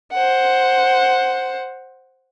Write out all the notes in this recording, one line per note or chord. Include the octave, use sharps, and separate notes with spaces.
C5 F#5